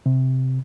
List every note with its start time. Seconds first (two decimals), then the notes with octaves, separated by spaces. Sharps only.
0.06 C3